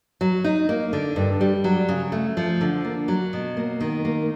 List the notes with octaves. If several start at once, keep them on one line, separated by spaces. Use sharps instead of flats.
F#3
D#4
A#3
D3
G2
G3
F#3
C#3
A3
F3
D3
A#3
F#3
B2
A#3
D#3
A#3